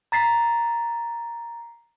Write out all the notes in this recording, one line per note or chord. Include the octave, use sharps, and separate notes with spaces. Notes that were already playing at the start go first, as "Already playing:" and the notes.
A#5 A6 B6 C7